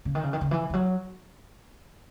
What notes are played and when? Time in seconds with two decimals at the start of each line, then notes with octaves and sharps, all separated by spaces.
0.05 C#3
0.15 D#3
0.24 C#3
0.33 D#3
0.41 C#3
0.51 E3
0.70 E3
0.74 F#3